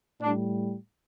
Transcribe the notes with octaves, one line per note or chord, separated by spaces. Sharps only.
A2 G3 D4